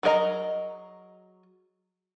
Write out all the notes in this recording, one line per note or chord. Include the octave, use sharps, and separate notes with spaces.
F#3 G#4 A#4 D#5 A#5